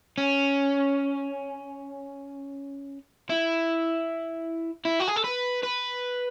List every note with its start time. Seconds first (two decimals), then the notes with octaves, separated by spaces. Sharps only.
0.18 C#4
3.30 E4
4.85 E4
5.00 F#4
5.07 G#4
5.16 A4
5.24 B4
5.63 B4